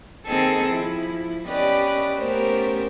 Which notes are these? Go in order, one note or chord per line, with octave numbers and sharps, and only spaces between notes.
D#3 C4 D#4 G#4 A4
F3 E4
B3 C#4 G4 B4 D5 D#5
A3 B3 C#4 G4 A#4 C5